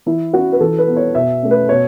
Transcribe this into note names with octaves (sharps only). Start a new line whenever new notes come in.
E3 E4
C#4 F#4
B4
E3 A4
B4
B3
C#5
B2 E5
A3 C#4
B4
B2 C#5